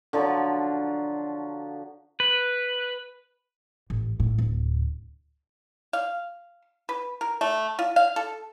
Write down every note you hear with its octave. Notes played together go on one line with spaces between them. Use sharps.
D3 F3 F#3
B4
A1
A2
D1
F5
B4
A#4
A3
F4
F5
A4